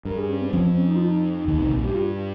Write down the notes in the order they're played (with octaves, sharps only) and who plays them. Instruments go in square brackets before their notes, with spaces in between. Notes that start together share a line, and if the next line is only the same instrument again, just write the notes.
[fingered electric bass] G2 [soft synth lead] A#4
[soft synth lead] G#4
C#4
C4
[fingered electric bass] F2 F3 [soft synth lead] C#4
[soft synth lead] C4
C#4
D#4
F4
D#4
[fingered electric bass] D#2 D#3
C2 C3
A#1 A#2
[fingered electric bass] G2 [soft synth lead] G4
[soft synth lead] F4